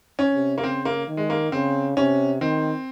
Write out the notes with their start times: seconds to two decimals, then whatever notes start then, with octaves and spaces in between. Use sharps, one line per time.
0.19 C#4
0.34 C3
0.58 A#3
0.63 C#3 C4
0.85 A#3
1.07 D#3
1.17 G#3
1.30 A#3
1.52 C#3 C4
1.97 C3 C#4
2.41 D#3 C4